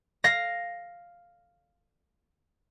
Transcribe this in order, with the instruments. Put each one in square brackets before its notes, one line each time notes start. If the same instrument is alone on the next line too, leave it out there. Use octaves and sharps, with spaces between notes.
[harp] F5 A#6